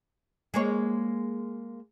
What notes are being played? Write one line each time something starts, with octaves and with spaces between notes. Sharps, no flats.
G#3 A#3 C#5